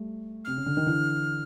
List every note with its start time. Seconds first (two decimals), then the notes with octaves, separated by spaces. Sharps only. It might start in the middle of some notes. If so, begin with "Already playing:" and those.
Already playing: G3 A3
0.45 C3 F6
0.57 C#3
0.66 D3
0.77 D#3
0.86 D3 E3